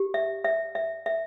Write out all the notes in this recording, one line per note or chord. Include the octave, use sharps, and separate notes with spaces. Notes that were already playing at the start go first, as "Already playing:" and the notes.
Already playing: G4
E5
E5
E5
E5